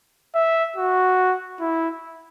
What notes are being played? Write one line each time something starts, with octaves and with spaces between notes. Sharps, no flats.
E5
F#4
E4